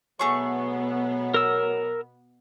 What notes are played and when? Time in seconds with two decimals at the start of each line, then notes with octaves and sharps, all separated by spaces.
0.19 B2 F#3 A3 B3 G#4 C#6
1.34 A#4 E6